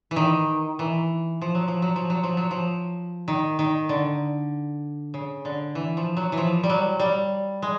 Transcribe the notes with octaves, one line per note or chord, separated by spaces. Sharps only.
E3
D#3
E3
F3
F#3
F3
F#3
F3
F#3
F3
F#3
F3
D#3
D#3
D3
C#3
D3
E3
F3
F#3
E3
F3
G3
F#3
G3
G#3